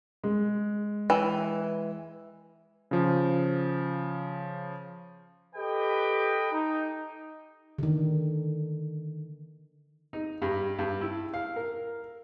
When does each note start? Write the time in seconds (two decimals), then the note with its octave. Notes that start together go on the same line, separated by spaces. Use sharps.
0.24 G#3
1.10 E3
2.91 C#3 F3
5.55 G4 A4 B4 D#5 G5
6.52 D#4
7.78 D3 D#3
10.13 D#4
10.42 G2
10.79 G2
11.01 E4
11.34 F5
11.56 A#4